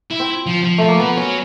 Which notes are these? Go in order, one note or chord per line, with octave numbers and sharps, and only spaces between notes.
E4
C4
F3
F3
F3 A3
A#3
F3 B3
F#3 C#4